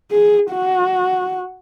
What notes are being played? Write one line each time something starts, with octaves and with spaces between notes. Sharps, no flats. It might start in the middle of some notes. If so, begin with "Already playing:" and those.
G#4
F#4